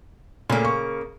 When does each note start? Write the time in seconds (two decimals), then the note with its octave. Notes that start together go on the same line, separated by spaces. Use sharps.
0.50 A#2 C#3 A3 A#3
0.65 C#6